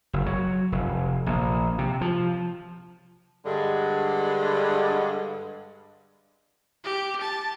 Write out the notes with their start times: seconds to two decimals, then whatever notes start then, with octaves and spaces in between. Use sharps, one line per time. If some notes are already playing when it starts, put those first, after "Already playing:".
0.13 F#1
0.26 F#3
0.72 F1
1.26 A#1
1.78 C3
2.01 F3
3.46 G2 D3 G#3
6.84 G4
7.21 A5